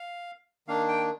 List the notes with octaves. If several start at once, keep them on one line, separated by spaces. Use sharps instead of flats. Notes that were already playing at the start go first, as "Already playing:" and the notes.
Already playing: F5
D#3 A#3 D4 F5
G5